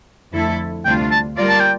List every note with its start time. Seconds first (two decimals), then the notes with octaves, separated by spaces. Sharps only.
0.33 F2 D3 A3 E4 A4
0.85 D2 C3 G3 D4 F4 G5
1.11 A5
1.37 G3 A#3 F4 A#4 D5
1.49 A5
1.60 G5